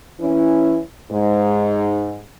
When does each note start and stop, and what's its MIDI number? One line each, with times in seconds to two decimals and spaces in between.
0.20 0.79 52
0.20 0.79 61
0.20 0.79 64
1.12 2.22 44